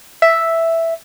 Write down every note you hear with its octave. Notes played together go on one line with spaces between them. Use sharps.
E5